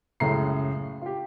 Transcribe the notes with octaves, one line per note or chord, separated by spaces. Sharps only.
C#2 F#2 A2 C#3 A#5 C7
F4 G4